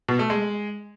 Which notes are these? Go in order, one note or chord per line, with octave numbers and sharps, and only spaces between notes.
B2
A3
G#3